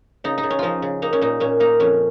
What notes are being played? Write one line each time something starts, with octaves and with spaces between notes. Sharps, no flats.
C#3 D#4
D#4
C#3
C#4
F3 D#4 F4
C#3
A#3 D#4
C#4
A#2 D#4
A#2 C#4
A#3 D#4
F2 C#4